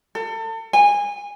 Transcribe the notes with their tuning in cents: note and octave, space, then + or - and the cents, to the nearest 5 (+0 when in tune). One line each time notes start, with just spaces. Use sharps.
A4 +35
G#5 -20